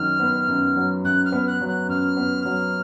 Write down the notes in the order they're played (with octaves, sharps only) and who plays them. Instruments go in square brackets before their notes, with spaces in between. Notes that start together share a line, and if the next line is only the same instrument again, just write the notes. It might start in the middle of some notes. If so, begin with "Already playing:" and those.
Already playing: [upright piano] F#2 D#3 F#3 [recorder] F6
[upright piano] B3
F#2
F#3
[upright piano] F#2 [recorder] F#6
[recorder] F6
[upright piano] B3
[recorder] F#6
[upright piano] F#3
[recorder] F#6
[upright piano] F#2 [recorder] F6
[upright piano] B3
F#3